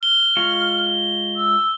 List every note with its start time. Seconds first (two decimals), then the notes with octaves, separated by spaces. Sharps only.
0.03 F6 G7
0.36 G#3 F4 C#6
1.36 E6